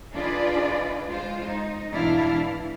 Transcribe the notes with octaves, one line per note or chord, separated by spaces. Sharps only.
D4 D#4 F4 G#4 B4 D5
G#3 F4 C5
D#4
E2 G#2 B2 D4 E4 F5
E3